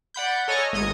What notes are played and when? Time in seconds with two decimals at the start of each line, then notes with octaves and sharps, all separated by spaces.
0.14 D5 F#5 B5 G6
0.48 A4 C#5 D#5 G#5 A#5 F6
0.73 G#1 D#5 D#6 G#6